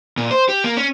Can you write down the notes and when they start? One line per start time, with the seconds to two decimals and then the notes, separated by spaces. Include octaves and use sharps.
0.17 A#2
0.31 C5
0.49 G4
0.64 A#3
0.77 C#4